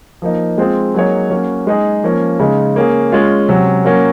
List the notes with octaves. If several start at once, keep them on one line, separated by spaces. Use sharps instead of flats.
F3 A#3 D#4
G#3 C4 F4 G#4
F#3 A#3 D#4 G#4 C#5
F#3 A#3 C#4
G#3 D#4 G#4
F3 A#3 C#4
C#3 G#3 D#4
A#3 C#4 G#4
G#3 C#4 F4
C3 F#3 C#4
F#3 A#3 C#4